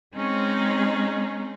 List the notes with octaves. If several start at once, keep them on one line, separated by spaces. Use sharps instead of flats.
G#3 C4 C#4 D#4 G#4